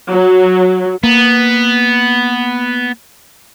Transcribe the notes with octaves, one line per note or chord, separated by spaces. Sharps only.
F#3
A#3 B3